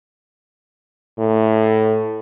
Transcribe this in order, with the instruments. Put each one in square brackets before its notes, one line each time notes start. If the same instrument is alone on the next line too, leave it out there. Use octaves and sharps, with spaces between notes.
[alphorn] A2